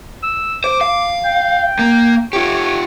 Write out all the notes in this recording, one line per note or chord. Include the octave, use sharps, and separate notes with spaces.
E6
C5 D6
F5
G5
A#3
F4 G4 C#5